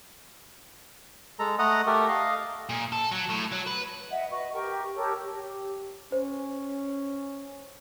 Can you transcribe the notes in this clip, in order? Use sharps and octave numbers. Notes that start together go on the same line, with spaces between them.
G#3 A4 A#5
A3 D#5 F#5 A#5 D#6
A3 G4 A4 A#4
D#5 F5
A#2
A4
F#3
A2
F#3
B4
D#5 E5 F#5
F#4 B4 D#5 C#6
G4 A#4 G5 C#6
G4 A4 A#4 C#5
G4
C#4 C5